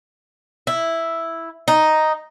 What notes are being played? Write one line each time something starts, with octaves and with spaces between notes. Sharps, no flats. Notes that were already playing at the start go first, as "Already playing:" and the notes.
E4
D#4